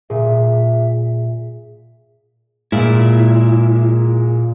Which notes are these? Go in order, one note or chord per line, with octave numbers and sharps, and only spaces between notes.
A#2 G#4 E5
A#2 G#3 A#3 E4